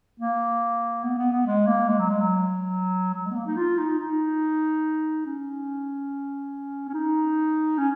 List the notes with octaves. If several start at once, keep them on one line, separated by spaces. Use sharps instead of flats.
A#3
B3
B3
B3
G#3
A#3
G#3
F#3
G#3
F#3
F#3
G#3
B3
A#3
D#4
F4
D#4
D#4
C#4
C#4
D#4
C#4